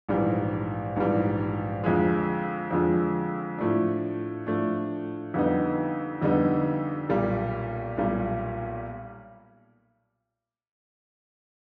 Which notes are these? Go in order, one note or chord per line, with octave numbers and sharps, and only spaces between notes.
A#1 G#2 E3 G3
A#1 G#2 E3 G3
F2 D3 F3 G#3
F2 D3 F3 G#3
A2 F3 A3 D4
A2 F3 A3 D4
F2 D3 G3 B3 D#4
F2 D3 G3 B3 D#4
B1 A#2 G3
B1 A#2 G3